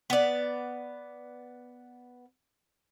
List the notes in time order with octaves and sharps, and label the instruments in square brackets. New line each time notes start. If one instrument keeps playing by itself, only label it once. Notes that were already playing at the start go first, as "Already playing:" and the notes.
[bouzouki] B3 D5